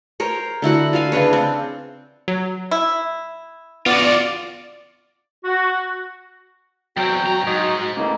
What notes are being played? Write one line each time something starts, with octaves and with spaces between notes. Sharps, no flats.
A#4 C5 C#5
D3 E4 F#4 F#5
F4 E5 F5 G#5
C#3 D4 B4 C#5
C4
F#3
E4
B3 F4 F#4 D5
F#4
E2 F#3 C4 F#4 G5
G2 A#5
G#2 D#4
C#3 E3 A3 A#3 D#5